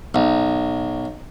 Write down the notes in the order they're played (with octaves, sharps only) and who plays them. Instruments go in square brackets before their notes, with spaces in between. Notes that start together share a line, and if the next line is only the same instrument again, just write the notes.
[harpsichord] B1